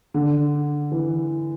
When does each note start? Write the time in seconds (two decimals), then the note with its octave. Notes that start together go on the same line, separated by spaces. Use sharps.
0.14 D3
0.92 E3